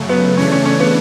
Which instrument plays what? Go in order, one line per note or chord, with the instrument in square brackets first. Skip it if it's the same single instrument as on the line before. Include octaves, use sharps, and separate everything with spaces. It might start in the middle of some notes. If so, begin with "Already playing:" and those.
Already playing: [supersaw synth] F#2 C#3 F#3 A3
[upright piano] B3
[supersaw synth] C#3 E3 A3 D4 [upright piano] C#4
[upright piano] C#4
C#4
B3